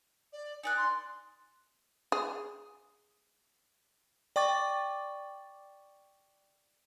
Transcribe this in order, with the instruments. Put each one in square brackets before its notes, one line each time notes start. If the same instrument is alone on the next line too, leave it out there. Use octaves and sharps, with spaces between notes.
[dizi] D5
[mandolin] D#4 D5 F#6 [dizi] G#5
[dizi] C6
[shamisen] G#4
[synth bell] D5 G5 C#6 D6 A6